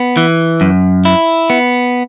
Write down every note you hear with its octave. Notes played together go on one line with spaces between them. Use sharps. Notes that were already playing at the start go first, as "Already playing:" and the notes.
Already playing: B3
E3
F#2
E4
B3